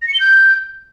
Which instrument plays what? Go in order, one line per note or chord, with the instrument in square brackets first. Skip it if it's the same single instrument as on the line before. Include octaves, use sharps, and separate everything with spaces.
[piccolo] A#6
C#7
G7
G6